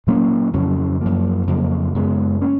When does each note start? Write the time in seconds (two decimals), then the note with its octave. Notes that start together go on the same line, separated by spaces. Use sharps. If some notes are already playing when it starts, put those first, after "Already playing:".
0.07 A#2 F#3 A#3 C#4
0.53 F2 C#3 F#3 C#4
1.01 F#2 F3 A#3
1.47 F2 C#3 F#3 A#3
1.94 F#2 C#3 G#3 B3
2.42 A#3 C#4